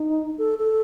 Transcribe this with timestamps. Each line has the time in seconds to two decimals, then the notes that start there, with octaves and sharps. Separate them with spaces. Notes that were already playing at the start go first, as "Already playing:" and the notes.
Already playing: D#4
0.38 A4
0.59 A4